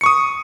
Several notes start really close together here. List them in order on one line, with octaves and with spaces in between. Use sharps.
C#7 C#6 D#6